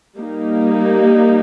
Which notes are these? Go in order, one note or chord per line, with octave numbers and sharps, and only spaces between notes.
G3 A#3 D#4 G4